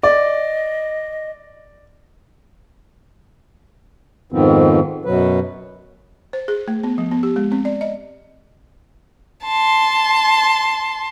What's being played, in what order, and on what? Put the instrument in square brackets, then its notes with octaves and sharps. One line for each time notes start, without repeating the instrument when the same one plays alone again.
[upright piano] D5 [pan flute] D#5
[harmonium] F2 G#2 D#3 F3 B3 C4
F#2 B2 F#3 B4
[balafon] C5
G#4
A3
B3
F3
B3
G4
G#3
C4
D5
D#5
[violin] A5 C6